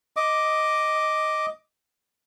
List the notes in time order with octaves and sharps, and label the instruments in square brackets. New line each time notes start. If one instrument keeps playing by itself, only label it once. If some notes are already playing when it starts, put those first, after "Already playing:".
[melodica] D#5 D6